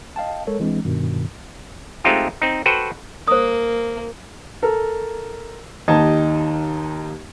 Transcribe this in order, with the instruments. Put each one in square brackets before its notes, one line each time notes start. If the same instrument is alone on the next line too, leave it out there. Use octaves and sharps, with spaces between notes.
[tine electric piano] D#5 F5 G5 A5
G#3 A4 A#4 C#5
E3 G#3 C4 D4
G2 B2 D#3
[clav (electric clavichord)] G#3 A3 C4 D#4 F4 G4
C4 D#4
F#4 A4 B4 C5 F#5 G5
[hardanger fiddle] A#3 [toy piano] C5 D#6
[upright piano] A4 A#4
D#2 D#4 G4 D#5 A5 G#6